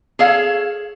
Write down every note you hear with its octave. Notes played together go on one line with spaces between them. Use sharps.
G#4 A4 C#5 F5